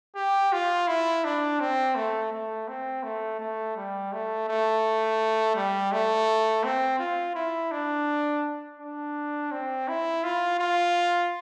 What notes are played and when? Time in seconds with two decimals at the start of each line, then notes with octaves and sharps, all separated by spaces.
0.16 G4
0.53 F4
0.87 E4
1.24 D4
1.60 C4
1.95 A3
2.32 A3
2.68 C4
3.03 A3
3.40 A3
3.76 G3
4.12 A3
4.48 A3
5.56 G3
5.92 A3
6.64 C4
6.99 F4
7.35 E4
7.72 D4
8.80 D4
9.52 C4
9.88 E4
10.24 F4
10.59 F4